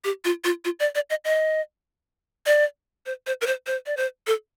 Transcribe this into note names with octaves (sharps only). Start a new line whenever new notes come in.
G4
F4
F4
F4
D5
D5
D#5
D#5
D5
C5
C5
A#4
C5
C5
D5
C5
A4